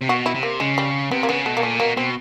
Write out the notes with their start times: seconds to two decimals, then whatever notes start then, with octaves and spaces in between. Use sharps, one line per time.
0.01 C3
0.08 B2 F#4
0.26 E4
0.34 C3
0.43 A#3
0.60 C#3 G#3
0.78 G3
1.11 C3 B3
1.23 A#3
1.29 C#3 B3
1.46 B2 A3
1.57 A#3
1.63 A#2 A3
1.80 B2 A#3
1.96 B2 C4